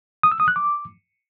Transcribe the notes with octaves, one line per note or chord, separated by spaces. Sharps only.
D#6
E6
D#6
F#6
D6